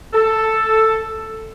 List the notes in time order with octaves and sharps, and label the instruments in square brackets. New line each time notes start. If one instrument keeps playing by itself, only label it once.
[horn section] A4